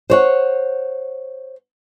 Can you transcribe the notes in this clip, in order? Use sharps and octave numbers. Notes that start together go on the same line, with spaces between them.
C5 C#5 F#5